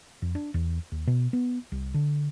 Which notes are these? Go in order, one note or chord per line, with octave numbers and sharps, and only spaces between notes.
F2
D4
E2
D#2
B2
B3
C2
D3